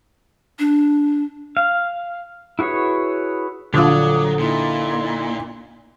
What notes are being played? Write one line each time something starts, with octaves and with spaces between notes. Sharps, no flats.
D4
F5
E4 F#4 G#4 B4 C#5
A#1 D3 F#3 F4 D6 D#6
A#2 D#4 E4 C6